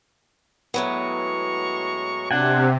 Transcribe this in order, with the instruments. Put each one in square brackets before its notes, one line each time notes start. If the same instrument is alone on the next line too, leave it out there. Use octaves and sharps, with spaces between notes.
[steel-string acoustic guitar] A2 F#3 B3 [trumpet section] G#3 A#5 C#6
[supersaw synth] C3 [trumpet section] D4 [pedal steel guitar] F#5 G#5